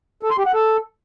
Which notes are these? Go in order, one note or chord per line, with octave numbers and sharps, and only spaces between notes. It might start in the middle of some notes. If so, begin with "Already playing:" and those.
A4
C6
G4
F#5
A4